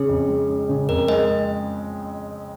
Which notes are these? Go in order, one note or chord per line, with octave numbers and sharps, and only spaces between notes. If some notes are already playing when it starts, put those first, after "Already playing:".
Already playing: C#3 C#4 G#4
F2
G#3
C#4
C#3
F2 A#4
G#3 D#5